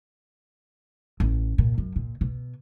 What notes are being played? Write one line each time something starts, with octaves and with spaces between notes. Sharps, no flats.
A1
A#2
F#2
A#2
B2